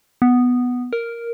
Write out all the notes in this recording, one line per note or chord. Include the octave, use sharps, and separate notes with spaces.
B3
A#4